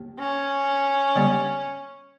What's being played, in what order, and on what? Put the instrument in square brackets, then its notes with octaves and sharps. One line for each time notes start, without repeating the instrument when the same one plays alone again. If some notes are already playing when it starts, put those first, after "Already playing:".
Already playing: [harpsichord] D#2
[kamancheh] C#4
[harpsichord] D3 G3 B3